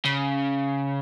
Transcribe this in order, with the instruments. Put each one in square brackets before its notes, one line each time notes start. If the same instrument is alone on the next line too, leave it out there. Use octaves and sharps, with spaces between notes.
[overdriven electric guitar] C#3